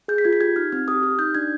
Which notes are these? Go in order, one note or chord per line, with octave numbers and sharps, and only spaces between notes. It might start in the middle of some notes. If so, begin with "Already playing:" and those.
G#4 G6
B6
F4 G#6
B6
G4 G#6
D#4 F6
C4 F6
G4 D#6
G4 F6
D#4 G6
D4 G#6